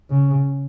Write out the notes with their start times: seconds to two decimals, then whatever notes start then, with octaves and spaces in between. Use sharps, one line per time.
0.10 C#3